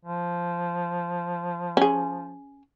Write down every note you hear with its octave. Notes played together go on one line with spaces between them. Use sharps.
F3
C#4 G#4